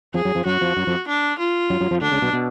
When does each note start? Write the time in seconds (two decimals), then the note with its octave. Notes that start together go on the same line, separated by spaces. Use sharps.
0.14 F2 F3 G#4
0.25 F#2 F#3
0.35 F2 F3
0.45 F#2 F#3 F#4
0.61 F2 F3
0.77 F#2 F#3
0.87 F2 F3
1.08 D4
1.39 F4
1.70 F#2 F#3
1.80 F#2 F#3
1.91 F2 F3
2.01 D2 D3 D4
2.12 C#2 C#3
2.22 B1 B2
2.33 B2